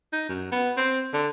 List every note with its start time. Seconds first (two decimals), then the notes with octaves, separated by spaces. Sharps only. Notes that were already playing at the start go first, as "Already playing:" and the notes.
0.13 D#4
0.29 F#2
0.52 B3
0.77 C4
1.14 D3